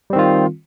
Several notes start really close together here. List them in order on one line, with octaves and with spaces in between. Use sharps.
G3 C4 D#3 F4